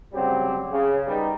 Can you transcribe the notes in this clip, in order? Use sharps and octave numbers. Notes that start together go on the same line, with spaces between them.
D2 C#3 F#3 G3 C4 G4
C#3
D#3 G3 B3 D#4